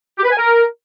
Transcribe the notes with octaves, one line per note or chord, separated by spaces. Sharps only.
G4
B4
G#5
A#4